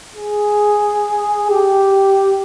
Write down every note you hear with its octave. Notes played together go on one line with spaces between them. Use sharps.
G#4
G4